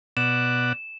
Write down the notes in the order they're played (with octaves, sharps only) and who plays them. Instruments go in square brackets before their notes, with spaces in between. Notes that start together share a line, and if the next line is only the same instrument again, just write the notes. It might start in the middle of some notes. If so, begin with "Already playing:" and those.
[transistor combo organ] B2 D5 F#5 [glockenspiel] E7